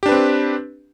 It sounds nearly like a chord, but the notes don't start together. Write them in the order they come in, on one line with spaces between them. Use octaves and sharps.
G4 D4 B4 C4